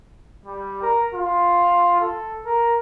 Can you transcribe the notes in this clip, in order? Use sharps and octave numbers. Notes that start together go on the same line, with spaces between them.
G3
A#4
F4
A4
A#4